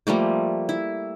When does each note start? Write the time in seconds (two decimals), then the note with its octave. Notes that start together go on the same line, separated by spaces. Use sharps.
0.07 F3 G3 A3 A#3
0.69 E4